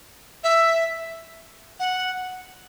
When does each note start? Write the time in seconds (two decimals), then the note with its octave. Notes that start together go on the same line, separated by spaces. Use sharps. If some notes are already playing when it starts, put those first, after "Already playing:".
0.44 E5
1.80 F#5